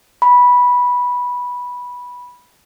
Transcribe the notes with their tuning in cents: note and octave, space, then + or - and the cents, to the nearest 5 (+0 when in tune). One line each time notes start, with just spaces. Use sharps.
B5 -10